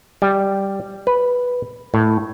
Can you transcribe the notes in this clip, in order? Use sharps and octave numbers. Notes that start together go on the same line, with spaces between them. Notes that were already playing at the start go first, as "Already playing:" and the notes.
G3
B4
A2